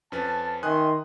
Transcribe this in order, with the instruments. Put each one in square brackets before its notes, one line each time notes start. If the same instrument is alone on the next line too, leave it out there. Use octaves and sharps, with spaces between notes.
[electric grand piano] F2 C#4 B4 [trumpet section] A5
[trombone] D#3 [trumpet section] E5 C6 [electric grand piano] G#5 D#6 F#6